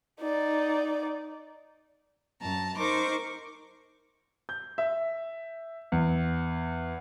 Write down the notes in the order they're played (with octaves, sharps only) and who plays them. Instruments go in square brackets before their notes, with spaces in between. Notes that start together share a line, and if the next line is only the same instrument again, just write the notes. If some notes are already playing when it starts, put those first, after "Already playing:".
[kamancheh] D#4 D5
[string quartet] F#2 A5 A#5
D#4 A#4 C5 C#6 D6
[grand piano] G6
E5
E2